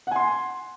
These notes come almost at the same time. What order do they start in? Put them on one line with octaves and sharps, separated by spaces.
F#5 G#5 C6